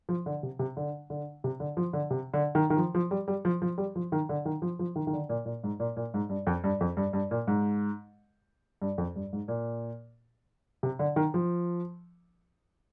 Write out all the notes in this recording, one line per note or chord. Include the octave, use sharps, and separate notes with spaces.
F3
D3
C3
C3
D3
D3
C3
D3
F3
D3
C3
D3
D#3
D#3
F3
F3
G3
G3
F3
F3
G3
F3
D#3
D3
D#3
F3
F3
D#3
D#3
D3
A#2
A#2
G#2
A#2
A#2
G#2
G2
F2
G2
F2
G2
G2
A#2
G#2
G2
F2
G2
G#2
A#2
C3
D3
D#3
F3